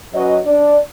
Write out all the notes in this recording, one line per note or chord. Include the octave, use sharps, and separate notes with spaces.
F#3 C#4 F#4 B4 D#5
D4 D5